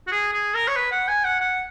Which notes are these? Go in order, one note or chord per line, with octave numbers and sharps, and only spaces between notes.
F#4
G#4
G#4
A#4
C#5
B4
F#5
G#5
F#5
F#5